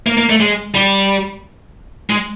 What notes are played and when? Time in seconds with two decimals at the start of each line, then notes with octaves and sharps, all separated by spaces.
0.06 A#3
0.17 A#3
0.29 A3
0.40 G#3
0.75 G3
2.10 G#3